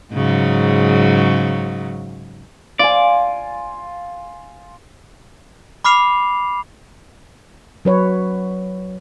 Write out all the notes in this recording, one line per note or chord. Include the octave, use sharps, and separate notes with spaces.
G#2 C#3 F#3
F4 D5 G#5
B5 D6 F6 C7 F7
F#3 B4 C#5